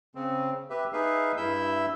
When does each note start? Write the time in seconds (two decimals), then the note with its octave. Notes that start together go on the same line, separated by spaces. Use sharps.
0.15 C#3 C4
0.70 G4 B4 E5
0.93 D#4 G#4 B4 E5 F5
1.37 G2 E4 E5 E6 G6